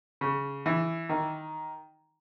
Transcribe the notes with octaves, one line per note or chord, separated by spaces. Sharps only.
C#3
E3
D#3